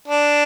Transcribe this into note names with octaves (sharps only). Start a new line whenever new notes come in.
D4